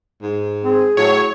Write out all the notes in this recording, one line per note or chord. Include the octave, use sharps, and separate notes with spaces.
G#2
C4 G#4
A2 F#3 C#5